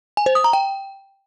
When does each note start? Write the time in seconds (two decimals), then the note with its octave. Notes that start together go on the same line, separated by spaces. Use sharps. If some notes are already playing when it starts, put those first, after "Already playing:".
0.17 G#5
0.26 C5
0.35 D#6
0.44 A#5
0.53 G5